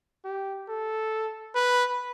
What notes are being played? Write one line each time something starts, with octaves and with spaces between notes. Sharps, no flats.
G4
A4
B4